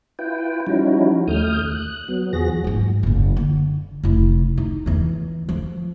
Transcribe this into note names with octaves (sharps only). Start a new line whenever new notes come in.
E4 F4 B4 G5
F3 G3 C#4 D#4 E4 F#4
D#2 A3 D#6 F6 G6
F#6
F#3 B3
E2 F3 F#4 G#4 A#6
G#2 F#3
F#1 A#2
D3
F1 E4
D#4
E2 E3
F3